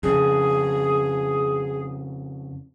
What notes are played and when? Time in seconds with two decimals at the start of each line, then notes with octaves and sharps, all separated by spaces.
0.03 F2 C#3 G#4